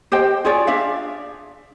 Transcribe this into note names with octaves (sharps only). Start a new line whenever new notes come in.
G4 C5 D#5 G5
F4 G#4 C#5 D5
D4 E5 F5